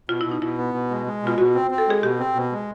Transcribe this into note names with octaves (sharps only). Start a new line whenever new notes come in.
B2 F4
B2 E4
D#4
B2 E4
B3
B2
G#3
G#3
B2 F4
B2 F#4
C4
C4
A4
G#3 G#4
B2 G4
C4
B2
G#3